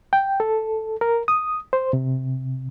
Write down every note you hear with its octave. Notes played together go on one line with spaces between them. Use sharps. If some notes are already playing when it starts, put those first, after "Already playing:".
G5
A4
A#4
D#6
C5
C3